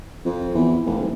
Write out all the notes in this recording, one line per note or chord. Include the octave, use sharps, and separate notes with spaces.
F2
E2
F1
F#1